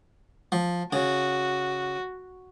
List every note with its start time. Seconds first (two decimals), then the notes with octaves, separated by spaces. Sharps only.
0.52 F3
0.93 C#3 F#4